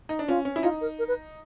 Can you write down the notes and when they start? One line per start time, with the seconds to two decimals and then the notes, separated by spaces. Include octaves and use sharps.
0.09 D#4
0.19 D4
0.28 C#4 F4
0.45 C#4
0.56 E4
0.63 D#4 F4
0.81 A#4
0.99 A#4
1.08 B4